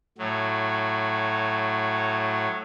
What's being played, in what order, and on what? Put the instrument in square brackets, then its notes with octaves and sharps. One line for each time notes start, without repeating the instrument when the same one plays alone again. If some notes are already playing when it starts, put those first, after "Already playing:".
[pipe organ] A2 F#3